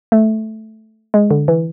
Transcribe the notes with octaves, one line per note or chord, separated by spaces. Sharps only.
A3
G#3
D3
E3